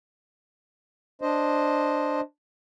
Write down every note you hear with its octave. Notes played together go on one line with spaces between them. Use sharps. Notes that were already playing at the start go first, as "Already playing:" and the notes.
D4 C5 D#5